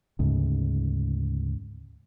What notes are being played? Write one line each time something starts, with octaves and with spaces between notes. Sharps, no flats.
D2 G#2 C#3